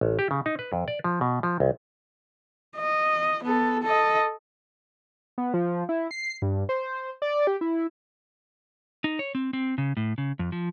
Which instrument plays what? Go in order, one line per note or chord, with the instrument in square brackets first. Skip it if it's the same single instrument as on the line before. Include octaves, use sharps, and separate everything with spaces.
[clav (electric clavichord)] A1
G4
C#3
D#4
B4
F2
D5
F3
B2
F3
C2
[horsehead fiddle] D#5
B3 A4
A4 D#5
[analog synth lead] B3
F3
E4
C7
G2
C5
D5
G4
E4
[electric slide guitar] D#4
C#5
C4
C4
C#3
A2
C#3
F2
F3